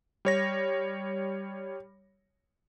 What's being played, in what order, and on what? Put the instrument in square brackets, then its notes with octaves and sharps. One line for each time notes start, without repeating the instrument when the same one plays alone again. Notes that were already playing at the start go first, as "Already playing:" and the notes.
[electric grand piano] G3 C#5 A#6